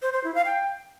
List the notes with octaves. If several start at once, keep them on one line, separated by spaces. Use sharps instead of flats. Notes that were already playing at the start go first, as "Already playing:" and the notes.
C5
C5
E4
F5
G5